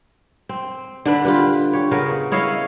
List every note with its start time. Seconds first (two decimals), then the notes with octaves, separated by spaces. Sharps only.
0.49 C4
1.05 D3 D4 B4
1.25 F4 G4 B4
1.73 G4 C#5
1.91 C#3 B3 A#4
2.32 E4 C#5 D#5 F5